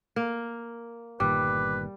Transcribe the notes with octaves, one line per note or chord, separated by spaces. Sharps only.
A#3
G1 A#2 D#3 G3 B4 D6